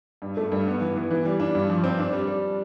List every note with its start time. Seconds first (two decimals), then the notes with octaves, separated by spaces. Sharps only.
0.22 G2
0.37 A3
0.52 G2
0.67 B3
0.81 E3
0.96 E3
1.11 E3
1.25 G3
1.40 D4
1.55 G2
1.70 F3
1.84 C4
1.99 D4
2.13 G3
2.28 G3